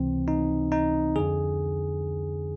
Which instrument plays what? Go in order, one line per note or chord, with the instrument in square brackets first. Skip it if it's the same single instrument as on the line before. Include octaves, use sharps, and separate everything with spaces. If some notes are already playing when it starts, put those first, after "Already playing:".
Already playing: [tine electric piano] C#2 C3 E3 C4
D#4
D#4
F2 D3 G#4